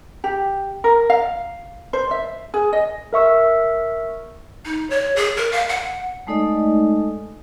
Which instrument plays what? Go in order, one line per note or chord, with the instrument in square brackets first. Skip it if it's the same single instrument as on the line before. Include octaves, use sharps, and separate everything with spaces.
[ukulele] G4
A#4
F5
C5
E5
G#4
D#5
[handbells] A#4 E5 C#6 E6
[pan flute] D#4
C#5
G#4
A#4
F5
F#5
[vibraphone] G#3 A3 D#4 A4 D5 D#5